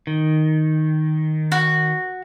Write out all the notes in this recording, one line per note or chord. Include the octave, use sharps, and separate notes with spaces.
D#3
F#4